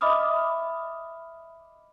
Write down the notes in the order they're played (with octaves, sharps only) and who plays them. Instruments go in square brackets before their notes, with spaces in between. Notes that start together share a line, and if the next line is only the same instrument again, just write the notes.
[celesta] D#5 E5 B5 D6 D#6 F6